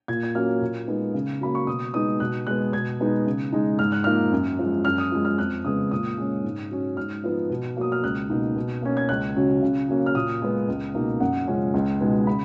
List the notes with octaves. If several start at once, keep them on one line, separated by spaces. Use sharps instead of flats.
A#2 G#6
G#6
F#3 A#3 C#4 F6
A#2
G#3 B3 D#4
C#3
F#3 A#3 B5
C#6
B2 D#6
G#3 B3 D#4 D#6
B2 F#6
G#3 B3 F#6
B2 G#6
G#3 B3 D#4
C#3
G#3 D#4
G#2 F6
F#6
F3 A#3 D#4 F6
F#2
F3 G#3
F#2 F6
D#6
F3 G#3
F6
F2 F#6
C#3 G#3 B3 D#6
A#2 D#6
G#3 C#4
G#2
F#3 C#4
G#2 F6
F3 B3 D#4
B2
F#3 A#3 D#6
F6
C#2 F#6
B2 A#3 D#4
B2
A#3 C#4
G#6
C#2 F#6
C#3 F#3 C#4
C#3
F#3 A#3 C#4
F6
A#2 D#6
G#3 B3
C#2
B2 A#3 D#4
F#2 F#5
C#3 F3 G#3 C#4
C#2
B2 G#3 B3 D#4
C#3 B5